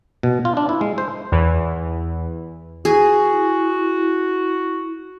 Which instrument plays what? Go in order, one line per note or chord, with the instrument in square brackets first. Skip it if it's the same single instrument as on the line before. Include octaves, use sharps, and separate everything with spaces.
[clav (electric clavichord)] B2
F4
D4
E4
G#3
C5
[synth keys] E2 E3
[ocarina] E4 [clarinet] F#4 [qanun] G#4